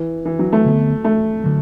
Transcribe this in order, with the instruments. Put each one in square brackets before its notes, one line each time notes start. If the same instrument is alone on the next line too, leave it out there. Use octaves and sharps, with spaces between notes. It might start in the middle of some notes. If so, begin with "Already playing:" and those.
Already playing: [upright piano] E3
E3
F#3
A3
[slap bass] D2 D3 B3
[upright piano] A3
[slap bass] D3 F#3